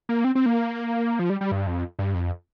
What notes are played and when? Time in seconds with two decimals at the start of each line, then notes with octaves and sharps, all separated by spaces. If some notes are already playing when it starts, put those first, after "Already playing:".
0.09 A#3
0.24 C4
0.35 C4
0.46 A#3
1.19 F3
1.30 G3
1.41 G3
1.51 G2
1.67 F2
1.99 G2
2.14 F2